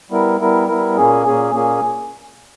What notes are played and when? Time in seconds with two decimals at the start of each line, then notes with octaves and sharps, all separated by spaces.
0.11 G3 B3 E4 A#4
0.40 G3 B3 E4 A#4
0.68 G3 B3 E4 A#4
0.97 A#2 A#3 C#4 G#4
1.26 A#2 A#3 C#4 G#4
1.54 A#2 A#3 C#4 G#4